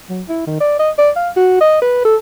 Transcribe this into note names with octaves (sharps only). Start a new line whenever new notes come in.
F#3
E4
D#3
D5
D#5
D5
F5
F#4
D#5
B4
A4